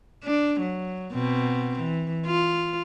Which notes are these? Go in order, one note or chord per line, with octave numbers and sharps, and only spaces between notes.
D4
F#3
B2 C4
E3
F4